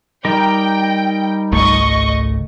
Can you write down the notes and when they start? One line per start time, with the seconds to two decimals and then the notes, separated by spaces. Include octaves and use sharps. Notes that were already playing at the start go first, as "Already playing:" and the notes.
0.25 G3 D#4 A#4 G5
1.52 G#1 C#2 A3 D#5 C#6